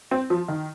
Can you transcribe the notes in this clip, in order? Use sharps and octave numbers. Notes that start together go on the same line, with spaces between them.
C4
F3
D#3